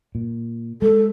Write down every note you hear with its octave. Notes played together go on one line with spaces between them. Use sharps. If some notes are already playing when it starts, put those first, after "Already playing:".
A#2
G#3 A4